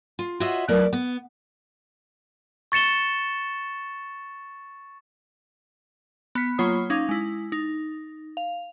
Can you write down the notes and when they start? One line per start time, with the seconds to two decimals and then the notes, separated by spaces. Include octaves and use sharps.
0.19 F4
0.40 F4 F#4 C#5 D#5 E5 F#5
0.68 F#3 A3 E4 A#4 B4 D5
0.93 B3
2.72 C#6 A6 C#7 E7 G7
6.35 B3 B5 B6
6.58 F#3 A#3 F4 C#5 B5 D#6
6.90 C#4 D#4 F5 D6 G#6
7.09 G#3 E4
7.52 D#4
8.37 F5